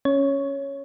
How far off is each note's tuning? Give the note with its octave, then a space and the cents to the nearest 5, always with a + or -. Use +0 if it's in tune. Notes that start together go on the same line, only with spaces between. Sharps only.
C#4 +0 C#5 +0